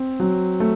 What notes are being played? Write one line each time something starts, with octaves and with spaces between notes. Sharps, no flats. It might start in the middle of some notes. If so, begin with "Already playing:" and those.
Already playing: C4
F#3
A3